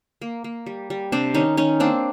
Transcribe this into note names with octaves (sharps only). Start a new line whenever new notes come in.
A#3
A#3
G3
G3
C3 C4 D4
D#3 C#4 D#4
D#3 C#4 D#4
A#3 C4 D4